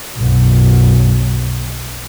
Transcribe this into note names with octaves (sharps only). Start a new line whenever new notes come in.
B1 F#2